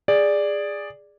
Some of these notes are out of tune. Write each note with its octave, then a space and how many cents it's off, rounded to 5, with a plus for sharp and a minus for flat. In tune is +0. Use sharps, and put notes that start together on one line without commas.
G#4 -10 D5 +0